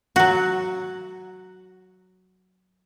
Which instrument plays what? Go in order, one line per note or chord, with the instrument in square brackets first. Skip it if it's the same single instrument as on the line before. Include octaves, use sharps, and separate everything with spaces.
[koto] F#3 F#4